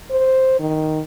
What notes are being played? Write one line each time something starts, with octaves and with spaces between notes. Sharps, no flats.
C5
D#3